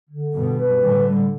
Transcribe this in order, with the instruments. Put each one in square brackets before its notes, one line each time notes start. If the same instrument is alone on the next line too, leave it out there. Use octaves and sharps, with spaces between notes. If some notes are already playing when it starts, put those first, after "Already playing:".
[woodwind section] D3
[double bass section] G2 B2 [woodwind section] B3
[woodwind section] B4
[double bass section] A2 D3 [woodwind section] G3
[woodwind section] G3